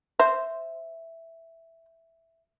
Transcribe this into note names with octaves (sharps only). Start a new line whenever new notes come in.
C5 E5